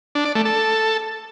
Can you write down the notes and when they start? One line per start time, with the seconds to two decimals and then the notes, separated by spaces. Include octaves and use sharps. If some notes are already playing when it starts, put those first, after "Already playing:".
0.15 D4
0.25 D5
0.35 A3
0.45 A4